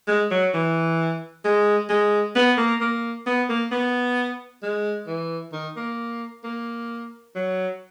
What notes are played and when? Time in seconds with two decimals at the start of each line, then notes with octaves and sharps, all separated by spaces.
0.08 G#3
0.31 F#3
0.54 E3
1.45 G#3
1.89 G#3
2.36 B3
2.58 A#3
2.81 A#3
3.27 B3
3.49 A#3
3.71 B3
4.63 G#3
5.07 E3
5.52 D#3
5.76 A#3
6.44 A#3
7.35 F#3